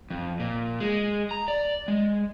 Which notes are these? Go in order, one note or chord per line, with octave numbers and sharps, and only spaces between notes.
F2
A#2
G#3
A#5
D5
G#3